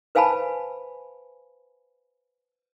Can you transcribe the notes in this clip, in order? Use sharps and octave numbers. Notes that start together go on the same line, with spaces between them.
B4 C5 F5 G#5 A5 B5